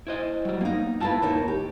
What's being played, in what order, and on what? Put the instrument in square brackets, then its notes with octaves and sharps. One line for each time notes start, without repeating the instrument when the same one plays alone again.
[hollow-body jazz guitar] E4 C5 D#5
F#3 G3
[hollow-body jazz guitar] A#3 [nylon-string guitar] B3 D#4
[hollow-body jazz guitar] A2 A5 [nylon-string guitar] E4 F4 B4
[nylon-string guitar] D#2 A#3 D#4 [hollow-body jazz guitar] A2
[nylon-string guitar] G4